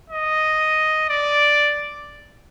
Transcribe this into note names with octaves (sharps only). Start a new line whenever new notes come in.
D#5
D5